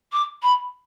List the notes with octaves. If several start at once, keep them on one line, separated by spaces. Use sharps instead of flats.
D6
B5